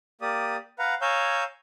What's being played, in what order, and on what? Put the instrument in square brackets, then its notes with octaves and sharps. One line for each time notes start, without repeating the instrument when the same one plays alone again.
[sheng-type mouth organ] A#3 G4 D5 D#6
B4 F5 F#5 A#5
C#5 F5 G#5 A#5 E6 G6